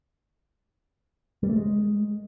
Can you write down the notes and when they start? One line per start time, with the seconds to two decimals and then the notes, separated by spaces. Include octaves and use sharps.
1.43 G3
1.49 A3
1.56 G#3